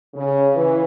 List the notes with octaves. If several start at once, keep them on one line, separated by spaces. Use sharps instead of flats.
C#3
E3